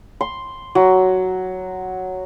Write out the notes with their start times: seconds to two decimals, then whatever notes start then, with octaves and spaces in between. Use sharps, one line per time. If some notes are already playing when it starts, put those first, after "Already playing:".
0.21 C6
0.75 F#3